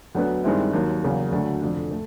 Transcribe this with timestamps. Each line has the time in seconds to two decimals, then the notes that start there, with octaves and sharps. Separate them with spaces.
0.15 D2 D3 F#3 B3 D4
0.44 G2 D#3 G#3 C4 E4
0.73 D#2 D#3 F#3
1.03 E2 C#3 F#3 A#3
1.32 D2 D3 F#3 A3
1.62 F1 F2 D3
1.91 A3